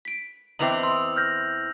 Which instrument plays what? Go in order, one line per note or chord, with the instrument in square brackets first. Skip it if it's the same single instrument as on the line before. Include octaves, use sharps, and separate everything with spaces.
[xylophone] B6 D7
[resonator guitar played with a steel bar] E2 E3 C4 [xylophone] D#5 E5 D6 [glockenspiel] F7 F#7
[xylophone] C6 D#6 [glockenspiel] E6
[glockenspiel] F6 G6 A#6